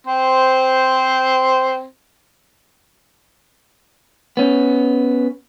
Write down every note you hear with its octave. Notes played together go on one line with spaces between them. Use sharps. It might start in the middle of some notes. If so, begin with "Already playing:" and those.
C4 C5
B3 C#4